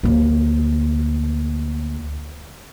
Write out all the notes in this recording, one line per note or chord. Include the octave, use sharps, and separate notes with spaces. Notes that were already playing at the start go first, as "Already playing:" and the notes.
D2 A#3